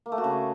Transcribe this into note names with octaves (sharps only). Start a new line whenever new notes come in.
A#3
A3
F#4
C#3